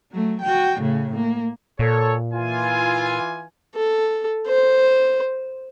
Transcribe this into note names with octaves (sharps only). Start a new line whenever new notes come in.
F#3 A3
F#4 G5
A2 C#3
A#3
A#2 A4 C#5
E3 F4 G#5
A4
C5